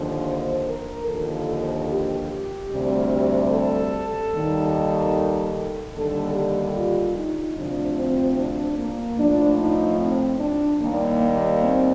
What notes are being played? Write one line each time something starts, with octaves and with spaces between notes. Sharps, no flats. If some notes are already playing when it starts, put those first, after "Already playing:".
Already playing: D#2 D3 F3
C5
A#4
D#2 D3 F3 A4
A4
G4
D2 C3 G3
A4
D#2 D#3 G3
D#2 D3 G3 A4
G4
F4
D#4
D2 C3 F3 D4
C4
D4
A#3
A2 F3 D4
D#4
C4
D4
D#2 D#3 G3 A#3
A#3
C4